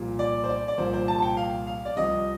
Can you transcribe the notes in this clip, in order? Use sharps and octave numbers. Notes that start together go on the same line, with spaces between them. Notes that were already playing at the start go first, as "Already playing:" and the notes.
Already playing: C2 A#2 F3
D5
C5
D5
D5
C2 A#2 F3 C5
C5
A5
A5
G5
F5
F5
D5
C2 C3 F3 D#5